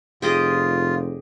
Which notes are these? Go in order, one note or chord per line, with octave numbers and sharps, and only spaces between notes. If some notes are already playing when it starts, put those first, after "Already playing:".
F1 F4 G4 G#4 D#5